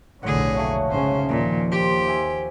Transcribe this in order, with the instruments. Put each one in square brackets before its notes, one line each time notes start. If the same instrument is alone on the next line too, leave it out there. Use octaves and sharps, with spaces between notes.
[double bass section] F1 B1 D3 [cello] A2 G#4 [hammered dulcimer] A#4 C#5 F#5
[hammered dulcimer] F#3 A3 A#3
[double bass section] G#2 C#3 C#4 [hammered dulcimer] D#4 [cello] C5
[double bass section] D#2 F3 [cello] A#2 [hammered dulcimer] A#4 D#5
[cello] G4 [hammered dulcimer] C5
[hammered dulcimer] E5 G#5